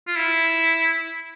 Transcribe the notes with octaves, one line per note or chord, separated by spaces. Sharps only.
F4
E4